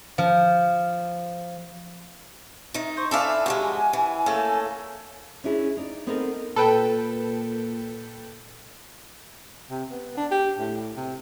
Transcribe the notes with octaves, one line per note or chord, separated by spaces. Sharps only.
F3
D#3 D#4 E5
C5 C#6
D4 E4 A4 D5 E5 F5 G#5
G2 F3 G#3 F#4
E3
A3 A#3 C#4 A4
C#4 D4 E4 G#4
D#4 D5
B3 C4 D#4 A4 A#4
A#2 A4 B4 G5
C3
B3
D4
G4
A2
C3